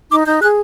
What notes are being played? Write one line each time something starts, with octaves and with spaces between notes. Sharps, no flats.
D#4 D6
D#4 G6
G#4 F#6